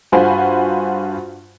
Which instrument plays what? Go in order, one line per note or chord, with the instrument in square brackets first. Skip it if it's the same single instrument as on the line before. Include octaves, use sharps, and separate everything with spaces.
[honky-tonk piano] G2 F4 F#4 C5 G#5 B5